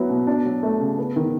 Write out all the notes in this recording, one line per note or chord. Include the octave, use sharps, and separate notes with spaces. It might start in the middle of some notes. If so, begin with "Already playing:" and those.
Already playing: F#3 B3 E4
B2
D4
F#3
A3
C#3
B3
D#3